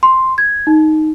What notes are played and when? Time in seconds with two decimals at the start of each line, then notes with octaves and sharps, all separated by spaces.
0.03 C6
0.38 G#6
0.67 D#4